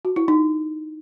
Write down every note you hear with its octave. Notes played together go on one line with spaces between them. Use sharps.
F#4
E4
D#4